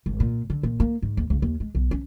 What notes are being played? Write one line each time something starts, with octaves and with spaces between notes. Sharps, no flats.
G#1
A#2
D3
A#2
A#3
G#2
D#2
C#2
D#2
G#3
B1
C#4